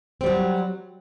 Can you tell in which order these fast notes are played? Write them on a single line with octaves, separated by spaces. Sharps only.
C4 G3 F#3